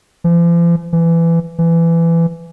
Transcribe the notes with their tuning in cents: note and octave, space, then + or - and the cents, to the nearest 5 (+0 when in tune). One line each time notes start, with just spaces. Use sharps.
F3 -45
E3 +20
E3 +20